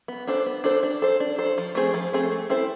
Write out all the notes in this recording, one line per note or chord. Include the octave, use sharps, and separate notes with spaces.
B3
D4 A4 C5
B3
D4 A4 C5
D4
A4 C5
D4
A4 C5
F3
A3 C4 G#4 C5
F3
A3 C4 G#4 C5
A3
C4 E4 A4 C5